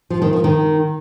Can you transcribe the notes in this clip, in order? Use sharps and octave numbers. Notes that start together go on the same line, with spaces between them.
F3
D#3
F3
D#3